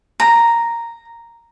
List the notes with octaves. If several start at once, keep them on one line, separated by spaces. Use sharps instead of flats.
A#5